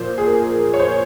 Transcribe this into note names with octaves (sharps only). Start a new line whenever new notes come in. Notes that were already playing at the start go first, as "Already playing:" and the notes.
Already playing: A#2 F3 C5
G#4
A#4
C#5
C5